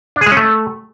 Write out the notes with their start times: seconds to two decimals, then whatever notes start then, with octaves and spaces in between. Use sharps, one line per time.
0.16 D4
0.21 G#4
0.26 G#3
0.32 C#4
0.37 A3